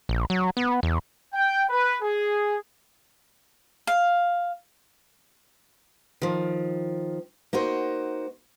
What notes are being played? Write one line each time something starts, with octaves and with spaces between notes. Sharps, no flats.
A#1
F#3
B3
E2
G5
B4
G#4
F5
D#3 F3
A#3 D#4 F#4 C5